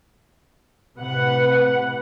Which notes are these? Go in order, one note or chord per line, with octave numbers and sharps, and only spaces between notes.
A2 C3 B4 F#5